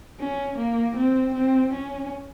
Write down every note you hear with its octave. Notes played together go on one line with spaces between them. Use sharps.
C#4
A#3
C4
C4
C#4